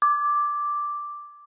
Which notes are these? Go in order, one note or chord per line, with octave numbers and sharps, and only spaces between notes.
D6